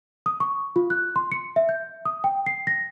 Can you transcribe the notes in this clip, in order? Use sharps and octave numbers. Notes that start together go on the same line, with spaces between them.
D#6
C#6
F4
F#6
C6
C#7
E5
G6
D#6
G5
C7
A#6